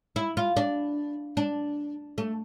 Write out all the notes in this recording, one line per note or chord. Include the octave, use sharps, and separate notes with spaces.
E4
F4
D4
D4
A3